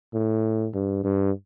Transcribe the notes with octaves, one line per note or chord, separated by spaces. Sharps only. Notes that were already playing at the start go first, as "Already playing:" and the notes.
A2
G2
G2